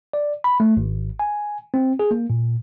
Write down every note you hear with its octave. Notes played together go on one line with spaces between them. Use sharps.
D5
B5
A3
G#1
G#5
C4
G#4
A#3
A#2